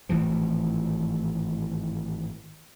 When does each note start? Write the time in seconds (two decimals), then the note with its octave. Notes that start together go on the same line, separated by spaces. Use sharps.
0.09 G#1 A2 E3 F3